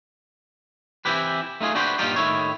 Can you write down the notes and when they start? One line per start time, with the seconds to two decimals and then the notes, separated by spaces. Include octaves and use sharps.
1.05 E3 C4 E4 G4 B4
1.61 A3 D#4 F4 G#4
1.75 D4 F#4 G4 B4 C5
1.98 G2 A#2 D#3 D#4 F4 G4
2.16 A2 D#3 E4 C#5